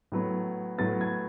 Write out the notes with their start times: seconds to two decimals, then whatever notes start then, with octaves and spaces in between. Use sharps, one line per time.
0.12 A2 F#3 B3
0.78 A2 F#3 B3 A6
1.01 G#6